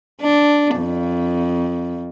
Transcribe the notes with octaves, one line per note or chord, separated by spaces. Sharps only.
D4
F2